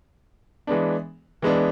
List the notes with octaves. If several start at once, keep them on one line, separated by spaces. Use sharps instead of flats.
E3 G#3 B3 D4
E3 G#3 B3 D4